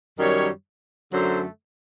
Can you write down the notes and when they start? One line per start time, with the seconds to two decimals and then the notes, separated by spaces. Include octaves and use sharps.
0.18 F#2 D#3 G3 C#5
1.12 F#2 D3 F#3 A3 C5